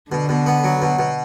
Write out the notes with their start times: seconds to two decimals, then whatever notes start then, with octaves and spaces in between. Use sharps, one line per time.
0.11 B2 D3
0.29 B2
0.46 B3
0.64 F#3
0.82 B2
0.99 B2